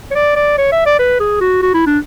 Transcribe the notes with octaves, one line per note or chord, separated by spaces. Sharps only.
C#5
D5
D5
C#5
E5
D5
B4
G#4
F#4
F#4
E4
D4